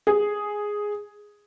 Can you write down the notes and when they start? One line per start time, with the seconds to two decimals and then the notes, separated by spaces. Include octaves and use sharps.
0.07 G#4